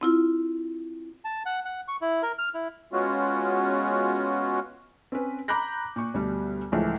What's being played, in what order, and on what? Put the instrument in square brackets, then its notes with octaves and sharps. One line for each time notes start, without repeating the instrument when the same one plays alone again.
[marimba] C4 E4 F4
[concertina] A5
F#5
F#5
C#6
E4
A#4
F6
E4
[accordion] G#3 B3 C#4 F4 F#4
[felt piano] C4 C#4 B4
A#5 B5 D6 F#6 G6 A#6
A#2 C#6
D2 B2 G3
C#2 A2 E3 F3 A3